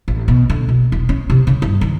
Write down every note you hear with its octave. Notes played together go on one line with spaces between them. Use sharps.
A1
B2
D3
B2
E1
C#4
C3
C#3
G2
D#3